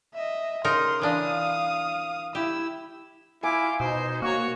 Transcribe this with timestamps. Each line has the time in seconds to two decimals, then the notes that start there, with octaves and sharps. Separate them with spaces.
0.14 D#5 E5
0.64 C#3 D#4 A#4 C6
1.02 E3 D4 F5 D#6
2.35 E4 G4 E6
3.43 E4 F4 G#5 D6
3.80 B2 D#4 C5
4.22 A#3 F#4 C#5 C#6